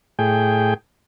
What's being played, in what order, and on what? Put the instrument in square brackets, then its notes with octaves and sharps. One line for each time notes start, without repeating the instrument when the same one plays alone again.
[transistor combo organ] A2 G#4 G5